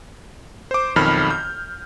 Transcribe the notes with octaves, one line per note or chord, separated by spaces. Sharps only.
C5 D6
B1 F2 D#3 B5 F6
G6